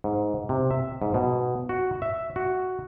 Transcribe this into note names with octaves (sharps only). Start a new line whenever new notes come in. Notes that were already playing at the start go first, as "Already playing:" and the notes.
G#2
C3
E5
G#2
B2
F#4
E5
F#4